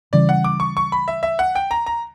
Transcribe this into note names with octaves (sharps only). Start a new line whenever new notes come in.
C#3 E3 G3 D5
F#5
D6
C#6
C#6
B5
E5
E5
F#5
G5
A#5
A#5